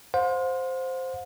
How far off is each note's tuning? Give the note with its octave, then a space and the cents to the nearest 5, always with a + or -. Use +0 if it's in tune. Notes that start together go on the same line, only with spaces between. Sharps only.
C5 +0 F5 +45